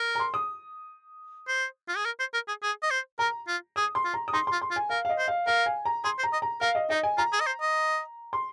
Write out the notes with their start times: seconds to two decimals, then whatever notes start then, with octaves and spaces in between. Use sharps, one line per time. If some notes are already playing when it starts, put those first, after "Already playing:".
Already playing: A#4
0.15 A#5
0.20 C6
0.34 D#6
1.48 C5
1.88 F4
1.96 G#4
2.05 A#4
2.19 C5
2.34 A#4
2.48 G#4
2.63 G#4
2.83 D#5
2.91 C5
3.19 A#4 A#5
3.48 F4
3.76 G#4 D#6
3.95 C6
4.05 F4
4.14 A#5
4.28 D#6
4.33 D#4 C6
4.47 C6
4.52 F4
4.62 C6
4.71 F4
4.76 G#5
4.90 A#4 F5
5.05 F5
5.09 D#5
5.18 C5
5.28 F5
5.47 A#4 F5
5.66 G#5
5.85 A#5
6.04 G#4 C6
6.18 C5
6.23 A#5
6.33 D#5
6.42 A#5
6.61 A#4 F5
6.75 D#5
6.90 D#4 D#5
7.03 G#5
7.18 F4 A#5
7.33 G#4
7.40 D#5
7.47 C5
7.61 D#5
8.33 C6